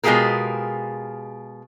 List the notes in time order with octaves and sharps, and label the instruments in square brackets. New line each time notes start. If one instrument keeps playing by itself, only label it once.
[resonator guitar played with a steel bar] B2 G#3 F4 G4 G#4 A#4